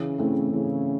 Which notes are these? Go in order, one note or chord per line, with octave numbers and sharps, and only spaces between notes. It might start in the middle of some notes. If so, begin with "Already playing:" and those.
Already playing: C#3 E3
A3 C4 E4 A4
C#3 E3